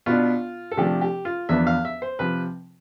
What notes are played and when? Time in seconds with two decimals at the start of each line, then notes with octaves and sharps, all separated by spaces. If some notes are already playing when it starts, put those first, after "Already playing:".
0.06 B2 B3 D4 F4
0.71 A4
0.77 C3 F3 A3 D4 G4
1.02 G4
1.25 F4
1.49 E2 D3 F3 B3 D4 E5
1.67 F5
1.85 E5
2.02 C5
2.19 C3 F3 C4 B4